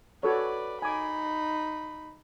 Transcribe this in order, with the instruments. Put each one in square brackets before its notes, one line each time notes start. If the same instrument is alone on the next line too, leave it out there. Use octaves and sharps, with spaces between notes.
[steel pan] F#4 A4 C#5 [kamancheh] B4 D5
[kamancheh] D#4 B5 [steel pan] G#5 D6